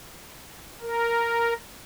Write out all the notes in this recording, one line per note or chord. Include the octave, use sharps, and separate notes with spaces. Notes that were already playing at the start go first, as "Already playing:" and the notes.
A#4